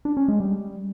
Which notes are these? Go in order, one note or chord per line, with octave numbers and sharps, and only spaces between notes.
D4
C#4
G#3
G3